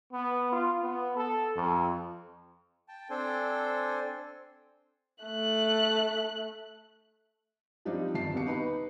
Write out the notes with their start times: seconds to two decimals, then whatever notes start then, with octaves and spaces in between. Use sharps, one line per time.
0.12 B3
0.52 F4
0.83 B3
1.16 A4
1.56 F2
2.88 G5 A5
3.10 C4 D4 A4 C5 G5 G#5
5.24 A3 F#6
7.85 F3 G3 C4 D4 D#4 G4
8.14 G1 A5 C7
8.33 D#2 B2 G4 C#7
8.46 D#4 B4 B5